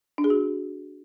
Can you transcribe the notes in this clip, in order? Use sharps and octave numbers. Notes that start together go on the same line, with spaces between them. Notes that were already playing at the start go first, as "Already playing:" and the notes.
D4
G#4
F#4